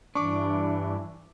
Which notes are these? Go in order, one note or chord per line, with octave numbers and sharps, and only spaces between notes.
G2 E3 D4 C#6 D6